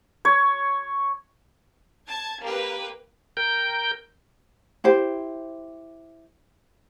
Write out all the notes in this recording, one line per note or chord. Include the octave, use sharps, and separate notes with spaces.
C#5
A5 G#6
A#3 G4 B4
A#4 G5 G6
E4 G4 C5